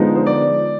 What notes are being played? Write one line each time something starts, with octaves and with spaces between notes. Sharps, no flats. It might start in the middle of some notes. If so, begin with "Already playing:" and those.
Already playing: D3 F3 G#3 B3 D#4
C5
D5